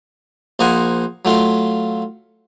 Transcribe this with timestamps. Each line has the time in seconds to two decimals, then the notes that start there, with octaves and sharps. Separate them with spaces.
0.59 A#1 A#3 C5 D#5 F#5 G#5
1.25 F#3 A3 F4 F5